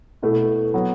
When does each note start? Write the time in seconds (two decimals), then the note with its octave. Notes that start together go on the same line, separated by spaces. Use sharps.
0.22 B2 A3 E4
0.74 F#3 B3